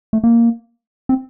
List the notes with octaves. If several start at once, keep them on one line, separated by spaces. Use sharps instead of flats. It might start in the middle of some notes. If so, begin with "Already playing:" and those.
A3
A#3
C4